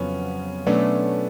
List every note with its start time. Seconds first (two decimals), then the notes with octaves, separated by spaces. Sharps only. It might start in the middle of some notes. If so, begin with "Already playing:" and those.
Already playing: F2 C#3 F#3 B3 C#4 F4
0.66 B2 F#3 A3 B3 C#4 D4